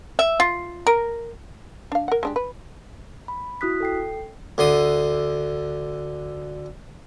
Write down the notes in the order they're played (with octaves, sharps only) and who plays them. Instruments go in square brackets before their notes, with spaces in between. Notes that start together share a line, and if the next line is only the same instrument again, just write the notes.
[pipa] E5
F4
A#4
[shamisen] D4 F5
A#4 F#5
G#3 D4 G4
B4
[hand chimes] B5
E4 F#4 D#6 F#6 B6
A4 G5 C7
[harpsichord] D2 D3 C6 D#6